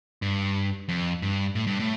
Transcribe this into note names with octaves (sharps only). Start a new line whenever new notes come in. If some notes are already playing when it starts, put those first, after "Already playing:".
G2
F2
G2
A2
G2
A2